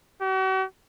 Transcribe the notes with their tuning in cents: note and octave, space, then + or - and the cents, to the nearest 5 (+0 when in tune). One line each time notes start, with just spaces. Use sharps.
F#4 +45